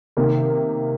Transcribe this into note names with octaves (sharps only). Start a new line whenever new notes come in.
C3 D#3 A#3